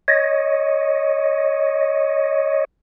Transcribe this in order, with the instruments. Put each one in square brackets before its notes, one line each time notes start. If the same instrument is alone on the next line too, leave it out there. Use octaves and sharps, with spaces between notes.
[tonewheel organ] C#5 D#5